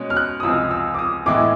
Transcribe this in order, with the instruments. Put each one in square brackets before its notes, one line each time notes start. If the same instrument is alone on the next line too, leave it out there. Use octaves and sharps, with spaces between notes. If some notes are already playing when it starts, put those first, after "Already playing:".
Already playing: [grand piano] B2 G#3 C#4
[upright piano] F6
F#6
D#6
[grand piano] C#2 C3 F3 G#3 C4 [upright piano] E6
[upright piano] E6
D6
D#6
[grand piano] A2 E3 G#3 B3 E4 [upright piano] D6